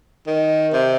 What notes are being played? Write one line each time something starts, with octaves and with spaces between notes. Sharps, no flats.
D#3
C3